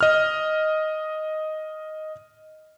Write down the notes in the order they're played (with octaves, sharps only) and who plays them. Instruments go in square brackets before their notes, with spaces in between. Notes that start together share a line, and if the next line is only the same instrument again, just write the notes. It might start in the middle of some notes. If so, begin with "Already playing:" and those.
[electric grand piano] D#5 F6